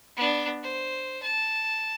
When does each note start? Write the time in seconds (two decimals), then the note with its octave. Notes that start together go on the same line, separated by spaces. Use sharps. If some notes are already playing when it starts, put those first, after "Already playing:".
0.17 B3 D4
0.63 C5
1.22 A5